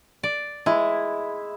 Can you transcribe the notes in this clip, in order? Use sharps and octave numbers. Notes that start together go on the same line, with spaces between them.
D5
G#3 E4